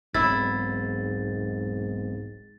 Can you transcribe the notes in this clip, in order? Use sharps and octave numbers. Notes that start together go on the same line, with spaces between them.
E1 B1 G#2 C4 E4 A6